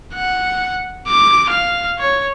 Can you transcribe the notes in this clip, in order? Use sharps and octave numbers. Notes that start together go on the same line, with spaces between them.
F#5
D6
F5
C#5